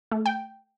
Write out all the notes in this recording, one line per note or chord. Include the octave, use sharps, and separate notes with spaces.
A3
G5